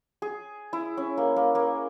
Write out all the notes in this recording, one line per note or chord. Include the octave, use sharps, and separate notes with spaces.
G#4
E4
C#4
A#3
A#3
A#3